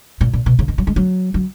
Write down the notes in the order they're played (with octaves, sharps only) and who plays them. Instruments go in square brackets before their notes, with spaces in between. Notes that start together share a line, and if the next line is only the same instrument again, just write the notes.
[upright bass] A#2
A#2
B2
C#3
D#3
F#3
G#3
F#3
F#3